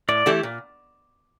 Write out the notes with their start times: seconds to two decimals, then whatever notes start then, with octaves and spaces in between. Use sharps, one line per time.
0.08 A2 D5
0.26 E3 A3 E4 G4
0.43 A#2